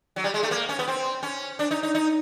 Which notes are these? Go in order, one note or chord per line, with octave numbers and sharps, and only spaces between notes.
F#3
G3
G#3
A3
A#3
C#4
B3
C4
C#4
D4
D#4
D#4
D#4